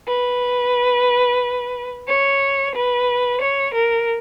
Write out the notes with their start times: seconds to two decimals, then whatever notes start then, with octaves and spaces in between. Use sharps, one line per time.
0.08 B4
2.08 C#5
2.75 B4
3.41 C#5
3.74 A#4